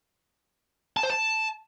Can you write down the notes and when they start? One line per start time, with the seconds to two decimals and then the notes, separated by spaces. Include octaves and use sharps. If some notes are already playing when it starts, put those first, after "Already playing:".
0.97 A5
1.03 C5
1.10 A5